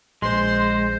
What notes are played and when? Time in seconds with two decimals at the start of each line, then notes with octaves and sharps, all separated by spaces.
0.22 A#1 G#3 C5 C6